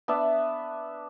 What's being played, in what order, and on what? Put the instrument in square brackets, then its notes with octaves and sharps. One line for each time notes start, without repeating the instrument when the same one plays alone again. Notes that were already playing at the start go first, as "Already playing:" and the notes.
[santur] B3 D4 E5